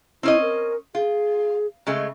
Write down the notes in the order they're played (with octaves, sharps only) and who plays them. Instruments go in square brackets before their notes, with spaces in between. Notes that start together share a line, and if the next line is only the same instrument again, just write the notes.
[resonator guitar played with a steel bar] C4 C#4 D#5 [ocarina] E4
[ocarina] A#4
[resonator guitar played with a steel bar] F4 [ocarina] G#4
[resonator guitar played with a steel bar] C#3 G#3 A3